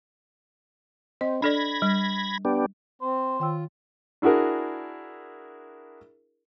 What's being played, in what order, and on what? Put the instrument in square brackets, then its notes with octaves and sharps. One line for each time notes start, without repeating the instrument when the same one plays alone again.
[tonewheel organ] C4 [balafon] D#5
[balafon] D4 A4 D5 [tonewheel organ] B5 G#6 A#6
[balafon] G3
[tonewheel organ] B3 D4 G4
[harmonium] C4 [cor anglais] C5
[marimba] D#3 G5 E6 [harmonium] F4
[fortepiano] D4 E4 F#4 G#4 A#4